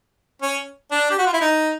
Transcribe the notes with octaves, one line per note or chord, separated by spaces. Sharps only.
C#4
D4
G4
F#4
F4
E4
D#4